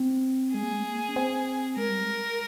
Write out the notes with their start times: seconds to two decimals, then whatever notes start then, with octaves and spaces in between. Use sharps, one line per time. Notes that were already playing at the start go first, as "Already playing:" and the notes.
Already playing: C4
0.54 G#3 G#4
0.63 A#3
0.73 G#3
0.84 A#3
1.09 C#4
1.16 C4
1.77 G#3 A#4
1.89 G3
2.02 G#3